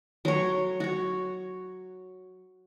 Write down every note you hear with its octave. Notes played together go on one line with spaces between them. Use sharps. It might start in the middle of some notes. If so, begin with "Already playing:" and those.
F#3 C#5
F#4 C#5